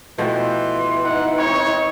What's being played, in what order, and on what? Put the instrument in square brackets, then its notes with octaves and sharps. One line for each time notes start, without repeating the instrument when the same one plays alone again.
[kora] B2 F3 A3 [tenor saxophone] E3 [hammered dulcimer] C5 G5
[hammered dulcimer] D#4 [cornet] F#5
[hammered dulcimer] C4 D#4 C#6 [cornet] C#5